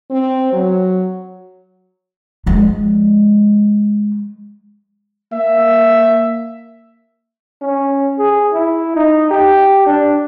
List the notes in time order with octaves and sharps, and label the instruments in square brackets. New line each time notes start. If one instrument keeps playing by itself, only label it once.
[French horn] C4
F#3
[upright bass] F3 G#3
[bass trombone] A#3 [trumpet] E5
[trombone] C#4
G#4
E4
D#4
G4
D4